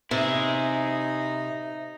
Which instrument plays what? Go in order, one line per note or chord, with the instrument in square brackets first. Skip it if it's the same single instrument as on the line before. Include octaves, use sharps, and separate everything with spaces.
[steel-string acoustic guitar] C3 [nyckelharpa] D#4 [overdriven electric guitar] E4 G#4 [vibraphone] E5